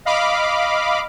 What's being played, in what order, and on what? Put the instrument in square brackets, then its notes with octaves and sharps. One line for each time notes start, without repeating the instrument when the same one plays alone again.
[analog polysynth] D#5 F5 B5 D6